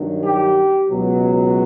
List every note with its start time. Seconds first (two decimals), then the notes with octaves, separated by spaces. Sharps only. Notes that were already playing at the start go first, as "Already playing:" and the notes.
Already playing: G2 D#3 F#3
0.23 G4
0.91 C#2 B2 F#3